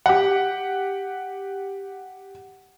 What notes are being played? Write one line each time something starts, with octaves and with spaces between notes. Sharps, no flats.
G4 F#5